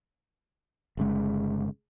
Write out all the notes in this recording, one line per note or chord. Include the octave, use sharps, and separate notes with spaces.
G1 C#3 G#3